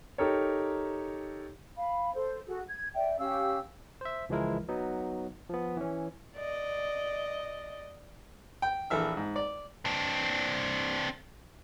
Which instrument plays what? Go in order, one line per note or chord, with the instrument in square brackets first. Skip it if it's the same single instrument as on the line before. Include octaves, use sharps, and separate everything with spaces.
[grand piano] D#4 G4 A4 A#4 C#5
[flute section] F5 B5
A4 C5
F#4 G#4 A4
G#6
D5 E5 G5
C#4 G4 F5 E6
[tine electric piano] C5 E5
C#2 E3 F3 G#3 E4 A#4
F#3 B3 D#4
F3 B3
E3 C#4
[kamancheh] D5 D#5
[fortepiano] G5
A#1 E3 A4 E5 F6
G#2
D5
[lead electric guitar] C4 D4